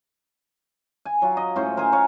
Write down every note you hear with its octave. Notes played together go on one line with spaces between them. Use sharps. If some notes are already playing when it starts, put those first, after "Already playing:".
G#5
F#3 F4
D#5
A2 C#4 C5
A#4 C5 D#5 G#5
A#4 C#5 F5 G#5